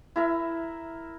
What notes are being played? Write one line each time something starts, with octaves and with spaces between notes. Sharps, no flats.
E4 A#4 E5